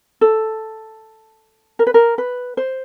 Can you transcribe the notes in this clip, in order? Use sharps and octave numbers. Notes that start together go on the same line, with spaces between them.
A4
A#4
B4
A#4
B4
C5